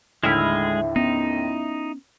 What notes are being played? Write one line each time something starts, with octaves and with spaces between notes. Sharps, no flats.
D#2 A2 D3 G#3 E4 G#4 F6
B3 C#4 D#4